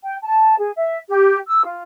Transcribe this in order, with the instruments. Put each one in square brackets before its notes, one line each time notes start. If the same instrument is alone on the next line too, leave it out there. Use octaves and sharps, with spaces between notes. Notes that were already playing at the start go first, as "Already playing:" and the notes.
[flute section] G5
A5
G#4
E5
G4
E6
F4